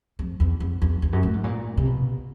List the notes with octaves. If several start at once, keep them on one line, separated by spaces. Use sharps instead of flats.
F2
E2
F2
E2
E2
F#2
A2
G#2
A#2
C3
B2